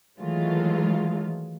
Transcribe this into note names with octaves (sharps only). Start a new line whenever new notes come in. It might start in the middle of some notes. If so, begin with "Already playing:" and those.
D#3 E3 F#3 G#3 A3 F4